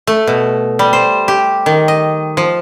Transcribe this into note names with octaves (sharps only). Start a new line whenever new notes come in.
A3
B2
G3
C5
G4
D#3
D#5
F3